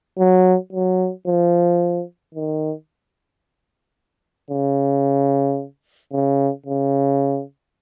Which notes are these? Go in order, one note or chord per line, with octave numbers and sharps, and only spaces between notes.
F#3
F#3
F3
D#3
C#3
C#3
C#3